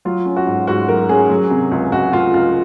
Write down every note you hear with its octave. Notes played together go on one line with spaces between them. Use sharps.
F#3 F4
C#4
F#4
G#2
G#2 F#4
F#3 A#4
C#4 G#4
F#3
C3
C#2
C#2 F#4
C#2 F4
C#2 F4